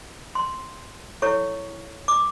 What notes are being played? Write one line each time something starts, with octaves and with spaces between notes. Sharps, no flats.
C6
E4 A4 C#5 C#6
D6